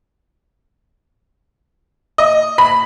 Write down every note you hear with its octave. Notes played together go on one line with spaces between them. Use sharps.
D#5
B5